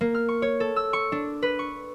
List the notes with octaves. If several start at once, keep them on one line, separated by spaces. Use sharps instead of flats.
A#3
F6
C#6
C#5
A4
E6
C#6
D4
B4
C#6